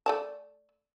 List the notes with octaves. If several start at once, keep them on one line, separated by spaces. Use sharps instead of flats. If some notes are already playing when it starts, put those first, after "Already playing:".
A3 D5 A5